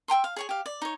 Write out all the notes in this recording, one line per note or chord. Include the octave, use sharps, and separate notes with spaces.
E5 G5 A#5 C6
F5
G#4 C#5 G#5
G4 F5
D5
D#4 C#5